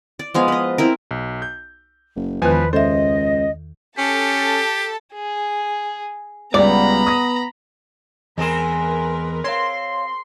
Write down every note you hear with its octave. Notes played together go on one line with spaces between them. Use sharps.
D5
F3 G#3 B3 F5
B4 D#5
C4 E4 A#4
B1
G6
F#1
E1 E2 D#3 F3 B4 G#5
C#2 A4 C5 D#5 E5
C#4 G4 A4 A5
G#4
C#2 G3 B3 D5 A#5 B5
D#6 A#6
E2 G#3 C4 G#4 A#4 B4
C4 C#5 F5 C6